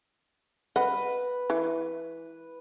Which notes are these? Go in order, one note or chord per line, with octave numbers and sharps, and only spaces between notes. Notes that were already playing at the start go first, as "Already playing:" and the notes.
B4 D#5 F#5
E3